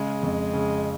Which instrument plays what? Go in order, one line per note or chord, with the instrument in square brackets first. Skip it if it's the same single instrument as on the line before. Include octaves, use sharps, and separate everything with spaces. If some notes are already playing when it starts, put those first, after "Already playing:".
Already playing: [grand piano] C#3 [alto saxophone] G#3
[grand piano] F2
C#3